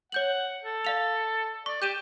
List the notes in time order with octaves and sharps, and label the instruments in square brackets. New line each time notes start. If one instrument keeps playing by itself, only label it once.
[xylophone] C#5 G6 F#7 [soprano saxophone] F#5
[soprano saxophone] A4
[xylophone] D5 F5 F7
[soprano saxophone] D5 [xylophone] C#6
[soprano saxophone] G4 [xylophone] G6 D#7 E7